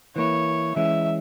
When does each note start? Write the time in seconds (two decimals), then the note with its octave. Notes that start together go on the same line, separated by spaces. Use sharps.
0.16 E3 A#3 E4 C#5
0.76 E3 G#3 C#4 E5